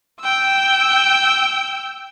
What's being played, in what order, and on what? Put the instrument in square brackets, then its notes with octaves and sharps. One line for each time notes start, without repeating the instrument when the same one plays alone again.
[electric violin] G5 E6